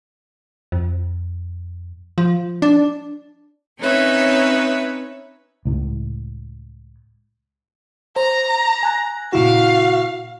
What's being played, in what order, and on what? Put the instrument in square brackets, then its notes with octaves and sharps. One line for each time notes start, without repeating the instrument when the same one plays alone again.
[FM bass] F2
F3
D4
[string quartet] C4 C#4 D#4 B4 C#5 E5
[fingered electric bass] C#2 A2
[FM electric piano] C5 [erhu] A#5
[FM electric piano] G#5 F#6 A#6
[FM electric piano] A#2 C#3 E4 [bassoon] F#4 [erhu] F5